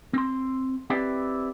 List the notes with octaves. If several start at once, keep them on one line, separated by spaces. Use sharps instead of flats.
C4 C6
C4 E4 G4 B4 D5